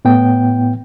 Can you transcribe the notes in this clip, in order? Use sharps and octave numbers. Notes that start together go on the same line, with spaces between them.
A2 B3 G5